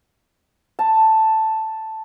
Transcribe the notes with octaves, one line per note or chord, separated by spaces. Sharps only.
A5